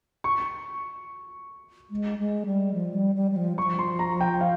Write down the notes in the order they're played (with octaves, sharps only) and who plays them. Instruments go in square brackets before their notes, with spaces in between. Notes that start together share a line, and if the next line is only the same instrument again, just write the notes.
[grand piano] C#6
[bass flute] G#3
G#3
G3
F3
G3
G3
G3
F3
[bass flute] F3 [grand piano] C#6
[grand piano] C6
A#5
G5
F5